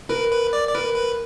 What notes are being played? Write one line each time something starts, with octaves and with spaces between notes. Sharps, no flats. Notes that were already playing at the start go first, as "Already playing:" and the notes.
A#4 B4
B4
D5
D5
A#4 B4
B4